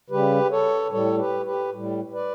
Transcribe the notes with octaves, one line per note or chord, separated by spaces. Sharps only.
C#3 G3 G4 B4
A4 C#5
A2 G3 A4 C#5
G4 B4
G4 B4
A2 G3
B4 D5